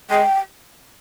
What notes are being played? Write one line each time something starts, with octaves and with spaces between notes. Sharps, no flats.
G#3 G5